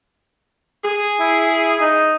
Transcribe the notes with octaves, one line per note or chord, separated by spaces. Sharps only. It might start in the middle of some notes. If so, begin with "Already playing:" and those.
G#4
E4
D#4